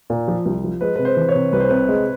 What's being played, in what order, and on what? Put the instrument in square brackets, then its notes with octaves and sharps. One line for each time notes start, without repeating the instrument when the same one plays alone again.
[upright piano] A#2
F3
C2
F3
[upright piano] G#3 [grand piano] B4
[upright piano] C3 [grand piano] B4
[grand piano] C5
[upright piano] E3
[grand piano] C#5
[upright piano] C3
[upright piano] C2 [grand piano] B4
[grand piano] C5
[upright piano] C3 [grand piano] B4
[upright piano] G#3